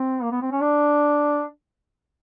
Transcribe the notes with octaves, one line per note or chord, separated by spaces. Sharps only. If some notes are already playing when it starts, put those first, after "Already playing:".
Already playing: C4
A#3
B3
C4
C#4
D4